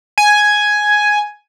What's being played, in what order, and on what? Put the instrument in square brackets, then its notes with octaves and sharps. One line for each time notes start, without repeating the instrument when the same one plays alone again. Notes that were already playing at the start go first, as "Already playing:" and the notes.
[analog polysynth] G#5